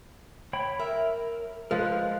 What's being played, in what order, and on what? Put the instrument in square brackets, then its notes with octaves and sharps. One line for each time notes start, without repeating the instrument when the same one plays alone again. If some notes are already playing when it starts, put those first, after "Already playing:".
[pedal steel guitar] C#5 G5 B5
[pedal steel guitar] A#4 [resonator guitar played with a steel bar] E5
[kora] F3 G#3 [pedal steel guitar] A#4 B4 F#6